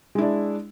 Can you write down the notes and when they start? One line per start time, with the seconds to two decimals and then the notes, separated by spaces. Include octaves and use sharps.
0.15 G#3
0.18 E4
0.22 D4